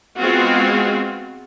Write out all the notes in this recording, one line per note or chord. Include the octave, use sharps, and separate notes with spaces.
G#3 B3 C4 F4 F#4